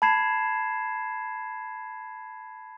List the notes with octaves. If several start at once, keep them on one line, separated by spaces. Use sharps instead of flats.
A5 B5 G#6 C7 E7